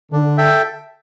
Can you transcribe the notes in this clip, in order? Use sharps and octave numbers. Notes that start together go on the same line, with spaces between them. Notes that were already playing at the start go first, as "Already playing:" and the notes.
D3 D4
A4 E5 G5